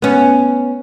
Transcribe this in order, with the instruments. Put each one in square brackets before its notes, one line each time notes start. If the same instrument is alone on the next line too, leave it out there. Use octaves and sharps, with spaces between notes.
[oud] B3 C#4